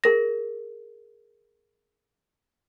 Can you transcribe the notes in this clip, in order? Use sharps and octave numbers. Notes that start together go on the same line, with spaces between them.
G#4 A#4 A#6